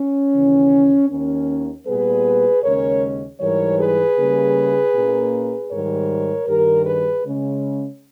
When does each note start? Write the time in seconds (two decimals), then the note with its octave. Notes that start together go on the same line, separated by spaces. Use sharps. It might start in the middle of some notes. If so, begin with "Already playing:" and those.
Already playing: C#4
0.33 D#2 C#3 E3
1.10 D#2 D#3 A#3 C#4
1.87 A#2 G3 B3 G#4 B4
2.63 D#2 C#3 G#3 C#4 A#4 C#5
3.40 G#2 E3 G3 A#4 C#5
3.79 G#4 B4
4.17 C#3 G3 A#3
4.94 A#2 A#3 C#4
5.70 G#2 D#3 G3 A#4 C#5
6.48 G2 D#3 G3 G4 A#4
6.86 G#4 B4
7.24 C#3 G#3 C#4